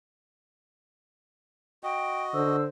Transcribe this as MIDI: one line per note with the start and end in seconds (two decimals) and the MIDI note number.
1.83 2.56 66
1.83 2.56 75
1.83 2.23 79
2.34 2.67 50
2.34 2.64 72
2.34 2.62 88